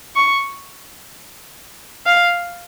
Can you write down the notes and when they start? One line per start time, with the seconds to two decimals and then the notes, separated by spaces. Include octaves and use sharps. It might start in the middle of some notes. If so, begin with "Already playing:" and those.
0.16 C#6
2.06 F5